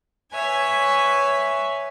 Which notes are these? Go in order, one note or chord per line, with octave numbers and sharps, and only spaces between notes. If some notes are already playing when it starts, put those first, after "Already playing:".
B4 C#5 E5 G#5